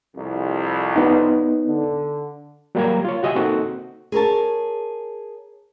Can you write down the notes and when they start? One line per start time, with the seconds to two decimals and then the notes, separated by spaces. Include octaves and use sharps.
0.15 C2 F2
0.96 B3 D#4
1.67 D3
2.75 F#3 G3 A#3 G4 A#5 G#6
3.05 F4 C#5
3.23 F#4 G4 D#5 E5 G#5
3.35 A#3 C4 D#4 F#4 A4
4.12 G#4 A#4 C#5 A5